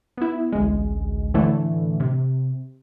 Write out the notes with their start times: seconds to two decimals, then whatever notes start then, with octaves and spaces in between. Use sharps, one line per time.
0.18 B3 E4
0.53 A1 D2 G#3
1.34 A2 D3 E3 A3
2.00 C3